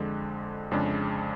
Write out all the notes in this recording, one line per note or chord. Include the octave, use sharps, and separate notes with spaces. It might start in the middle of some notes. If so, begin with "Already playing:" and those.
Already playing: F2 D3 G#3
F2 C#3 G#3 D4